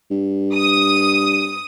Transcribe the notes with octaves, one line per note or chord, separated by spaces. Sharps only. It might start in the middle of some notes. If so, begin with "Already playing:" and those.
G2
D#6